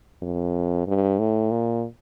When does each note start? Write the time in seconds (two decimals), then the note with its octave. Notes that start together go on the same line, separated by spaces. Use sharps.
0.22 F2
0.87 G2
1.19 A2
1.51 A#2